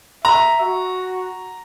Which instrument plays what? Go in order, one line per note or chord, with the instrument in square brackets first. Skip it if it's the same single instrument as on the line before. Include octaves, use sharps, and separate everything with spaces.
[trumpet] E5 [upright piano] A#5
[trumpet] F#4